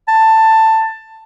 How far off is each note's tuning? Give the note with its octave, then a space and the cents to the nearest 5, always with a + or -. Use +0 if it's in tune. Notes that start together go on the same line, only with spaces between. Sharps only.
A5 +15